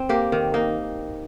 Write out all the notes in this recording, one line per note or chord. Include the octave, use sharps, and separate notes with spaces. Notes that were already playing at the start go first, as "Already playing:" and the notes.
Already playing: C4
A#3 G4
D#3
A#3 D#4